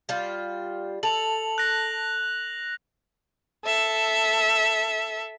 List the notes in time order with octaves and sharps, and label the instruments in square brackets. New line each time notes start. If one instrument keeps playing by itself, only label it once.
[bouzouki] G3 F4
[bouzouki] A4 [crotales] F7 F#7
[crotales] F#6 A#6
[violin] A4 E5